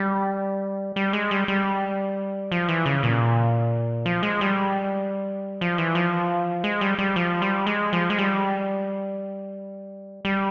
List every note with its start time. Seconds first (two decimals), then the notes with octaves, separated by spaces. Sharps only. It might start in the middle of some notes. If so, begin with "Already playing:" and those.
Already playing: G3
0.96 G3
1.13 G#3
1.31 G3
1.48 G3
2.52 F3
2.68 E3
2.86 C#3
3.03 A#2
4.06 F3
4.23 G#3
4.41 G3
5.61 F3
5.78 E3
5.95 F3
6.64 G#3
6.81 G3
6.98 G3
7.16 F3
7.42 G3
7.66 G#3
7.93 F3
8.10 G#3
8.18 G3
10.25 G3